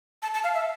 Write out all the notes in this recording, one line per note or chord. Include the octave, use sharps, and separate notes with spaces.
A5
A5
F5
E5